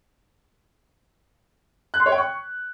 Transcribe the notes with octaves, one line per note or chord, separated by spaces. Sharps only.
F#6
C6
C#5
G5
C#6